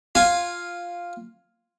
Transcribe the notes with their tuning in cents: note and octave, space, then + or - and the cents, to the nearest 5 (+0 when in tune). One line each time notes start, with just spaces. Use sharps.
F4 +0 G#5 +0